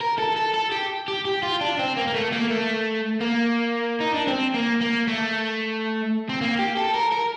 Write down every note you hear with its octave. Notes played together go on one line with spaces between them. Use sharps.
A#4
A4
A4
A4
G4
G4
G4
F4
D4
C4
A#3
A#3
A3
A#3
A3
A#3
D#4
D4
C4
A#3
A#3
A3
C4
A#3
G4
A4
A#4
A#4